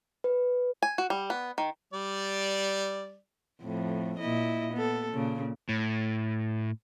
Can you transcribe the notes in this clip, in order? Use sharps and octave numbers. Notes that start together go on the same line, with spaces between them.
B4
G#5
F#4
G3
B3
D#3
G3 D5
F2 A2
A#2 E4 D#5
B3 A4
A#2 C#3
A2